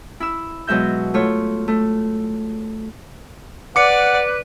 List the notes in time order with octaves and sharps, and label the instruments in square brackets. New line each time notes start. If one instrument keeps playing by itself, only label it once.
[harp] E4 E6
B2 F#3 G#3 E5 G6
A3 F4 C#5
A3
[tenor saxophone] B4 [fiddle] D5 [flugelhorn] F#5 [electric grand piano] D6 C#7